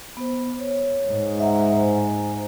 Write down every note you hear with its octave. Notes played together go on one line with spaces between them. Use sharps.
B3 C5
C#5
G#2
E5 F#5 A#5
C5 G#5 A#5